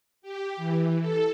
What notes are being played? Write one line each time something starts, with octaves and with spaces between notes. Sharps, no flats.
G4
E3
A4